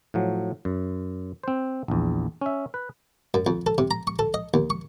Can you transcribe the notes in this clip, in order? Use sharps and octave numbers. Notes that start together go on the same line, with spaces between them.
A2 F3 F#3
F#2
C4 C5
A#1 E2
C#4 E5
B4
F#2
F2
A4
C3
A#5
C#6
A4
D#5
D#2
C#6